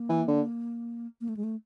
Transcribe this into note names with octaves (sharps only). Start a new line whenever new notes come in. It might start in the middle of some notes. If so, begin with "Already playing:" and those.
Already playing: A#3
E3
D3
A#3
A3
G#3
A3